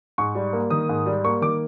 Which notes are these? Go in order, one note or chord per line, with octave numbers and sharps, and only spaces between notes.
G#2 C#6
G3
A#3
D#3 D#6
G#2
G3
A#3 C#6
D#3 D6